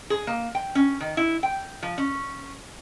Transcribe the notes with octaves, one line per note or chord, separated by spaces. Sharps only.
G#4
A#3
G5
C#4
D#3
E4
G5
F3
C#4